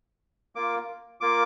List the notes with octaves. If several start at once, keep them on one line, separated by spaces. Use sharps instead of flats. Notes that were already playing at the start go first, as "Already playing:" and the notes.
A#3 F4 D6
A#3 F4 D6